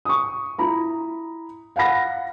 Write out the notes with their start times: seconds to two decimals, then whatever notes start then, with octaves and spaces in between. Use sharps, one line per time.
0.05 C#6 D#6
0.58 E4 A#5 B5
1.76 F5 F#5 B5 A#6